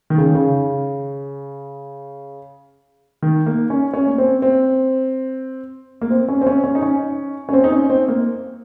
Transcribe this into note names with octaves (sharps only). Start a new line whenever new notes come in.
D#3
C#3
D#3
C#3
D#3
A#3
C#4
C#4
A#3
C4
C4
A#3
C4
C#4
C4
C#4
C#4
D#4
C#4
C#4
C4
D#4
C#4
C4
A#3